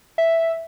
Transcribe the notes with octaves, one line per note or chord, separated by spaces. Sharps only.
E5